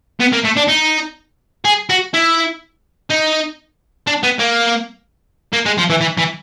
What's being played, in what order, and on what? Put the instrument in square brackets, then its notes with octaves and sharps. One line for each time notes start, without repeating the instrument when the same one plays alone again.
[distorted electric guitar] B3
A#3
A3
D4
D#4
G#4
F#4
E4
D#4
D4
B3
A#3
A#3
G#3
F3
E3
E3
E3